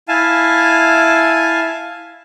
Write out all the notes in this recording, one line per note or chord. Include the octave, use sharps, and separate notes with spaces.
E4 F5 G#5 A5